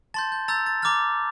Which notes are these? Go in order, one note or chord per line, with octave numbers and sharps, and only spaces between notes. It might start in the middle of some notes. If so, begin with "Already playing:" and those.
A5 C6 G6 A6
G6
A#5 E6 G6 A6
A6
A#5 D6 F6 A6